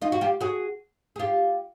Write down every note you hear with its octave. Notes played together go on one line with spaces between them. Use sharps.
D#4 F4
F#4
F4 G4
F#4 G#4
G#4
F4 G4